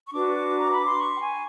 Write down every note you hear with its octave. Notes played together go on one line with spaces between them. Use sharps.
C#6
D4 F#4 B4 D6
A#5
B5
C6
C#6
G5
G#5